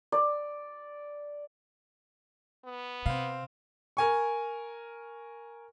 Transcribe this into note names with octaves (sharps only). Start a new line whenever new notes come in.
D5
B3
C3 C4 F5
A#4 G#5 C#6